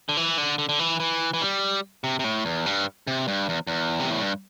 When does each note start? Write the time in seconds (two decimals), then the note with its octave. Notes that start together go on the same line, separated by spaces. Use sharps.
0.09 D3
0.17 E3
0.38 D3
0.58 D3
0.69 D3
0.79 E3
1.00 E3
1.34 E3
1.42 G3
2.04 C3
2.19 C3
2.24 A2
2.45 E2
2.66 G2
3.07 C3
3.28 G2
3.49 E2
3.67 E2
3.99 C3
4.10 A2
4.21 G2